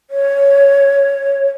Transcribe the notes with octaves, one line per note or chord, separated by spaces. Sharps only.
C#5